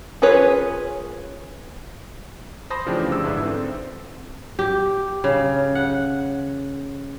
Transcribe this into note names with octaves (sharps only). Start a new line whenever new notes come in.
C#4 F4 G#4 B4 C#5
C5 A5 B5 C6 D#6 A#6
C#3 E3 F3 A3 D4 G4
G1 E6
G1 G#2 D4 E4 B4
C4 A4
G4
C#3
F#5